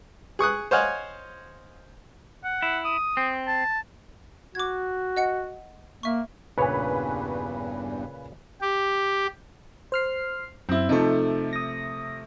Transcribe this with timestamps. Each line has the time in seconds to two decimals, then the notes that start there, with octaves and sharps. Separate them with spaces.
0.39 G#4 C#6 D#6 F#6
0.71 C5 C#5 D#5 F5 F#5 G#5
2.44 F#5
2.62 E4
2.84 D#6
3.17 C4
3.47 A5
4.55 F#4 D6 G#6
5.17 D#5 F#5 C#7
6.03 A#3 E5 C#6
6.58 E2 G2 A#2 C#3 B4 C#5 G#5
8.61 G4
9.92 C5 F6 C7
10.69 F#2 C4 E4
10.89 C3 F3 A3 D#4 A4
11.53 D#6 A#6